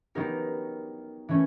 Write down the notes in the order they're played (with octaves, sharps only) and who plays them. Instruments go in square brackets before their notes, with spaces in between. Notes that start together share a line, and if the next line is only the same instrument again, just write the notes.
[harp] F#3 B3 D#4 G4 A#4
E3 A3 C#4